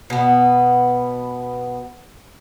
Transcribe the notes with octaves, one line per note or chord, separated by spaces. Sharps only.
B2 B3